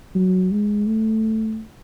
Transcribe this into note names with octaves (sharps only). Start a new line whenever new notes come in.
F#3
G#3
A3